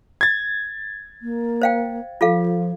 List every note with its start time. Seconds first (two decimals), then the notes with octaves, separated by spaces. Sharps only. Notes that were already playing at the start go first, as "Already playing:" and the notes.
0.21 G#6 A6
1.22 A#3
1.62 C5 F5 G5
2.21 F3 F4 A4 F5